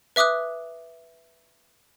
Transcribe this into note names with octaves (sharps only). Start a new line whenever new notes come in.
B4 E5 D6 D#6 F#6